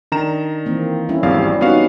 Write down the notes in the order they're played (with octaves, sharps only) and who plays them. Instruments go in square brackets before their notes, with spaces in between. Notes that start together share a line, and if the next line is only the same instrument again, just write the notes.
[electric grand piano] D#3 A#5 E7 [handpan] D4
[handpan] E3 A#3 C4
G3 C#4 E4
[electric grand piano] G#1 E2 F5 [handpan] F#3 G3 C4
[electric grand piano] B3 F#4 F5 [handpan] C#4 D#4